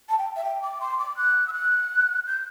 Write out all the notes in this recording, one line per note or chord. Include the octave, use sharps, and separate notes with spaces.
A5
G5
E5
G5
D6
C6
D6
F#6
E6
F#6
G6